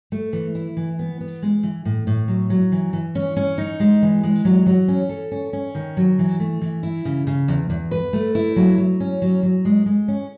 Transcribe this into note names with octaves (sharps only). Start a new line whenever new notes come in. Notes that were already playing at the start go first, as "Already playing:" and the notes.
A3
E3
E4
E3
B3
B3
G#3
E3
A2
A2
F#3
F#3
E3
E3
C#4
C#4
D#4
G#3
E3
G#3
F#3
F#3
C#4
A4
C#4
C#4
D#3
F#3
E3
A3
E3
E4
C#3
C#3
E2
E2
B4
A3
E4
F#3
F#3
C#4
F#3
F#3
G#3
G#3
C#4